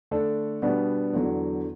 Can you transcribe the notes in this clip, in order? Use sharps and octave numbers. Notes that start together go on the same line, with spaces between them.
D3 A3 D4 A4
B2 G3 B3 D4
E2 D3 F#3